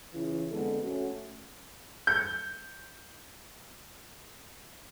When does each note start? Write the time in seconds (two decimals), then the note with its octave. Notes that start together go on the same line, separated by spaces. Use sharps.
0.14 C#3 E3 E4 F4
0.51 F2 D3 G#3 B3 A4
0.83 A3 C#4 F#4
2.07 G6 C#7